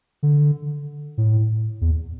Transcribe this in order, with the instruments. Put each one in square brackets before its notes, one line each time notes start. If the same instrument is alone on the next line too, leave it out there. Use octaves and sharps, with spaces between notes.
[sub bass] D3
A2
E2